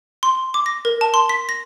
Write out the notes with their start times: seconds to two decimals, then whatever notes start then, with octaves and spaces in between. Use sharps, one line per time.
0.23 C6
0.54 D6
0.66 A#6
0.85 A#4
1.01 A5
1.14 C6
1.29 B6
1.49 A#6